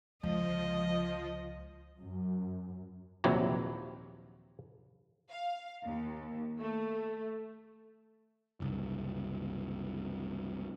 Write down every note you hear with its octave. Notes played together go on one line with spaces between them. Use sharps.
C#2 D3 F3 D#5
F#2
A#1 D#2 C3 E3 F#3
F5
D#2
A3
F#1 C2